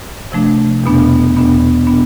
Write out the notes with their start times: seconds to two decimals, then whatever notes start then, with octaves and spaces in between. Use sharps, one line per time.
0.32 C3 F3 A3 D4
0.84 E2 B2 B3 D4
1.35 E2 B2 B3 D4
1.86 B2 B3 D4